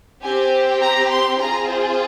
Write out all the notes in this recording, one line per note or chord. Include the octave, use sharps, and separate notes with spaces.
C4 G4 G#5
A#5
C6
C4 F4 G#4 A#5
C5